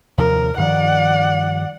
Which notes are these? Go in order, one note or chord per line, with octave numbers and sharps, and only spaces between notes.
D#2 C3 F3 A#4
G2 D#3 F3 D5 F#5